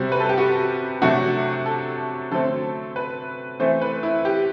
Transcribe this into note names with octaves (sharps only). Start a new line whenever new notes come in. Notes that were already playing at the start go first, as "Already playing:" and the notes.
Already playing: C3 G3 C4 F#4
B4
A4
G4
F#4
C3 F#3 A3 D4 F#4
A4
D3 F#3 A3 C4 A4
B4
E3 A3 C4 C5
B4
E4
G4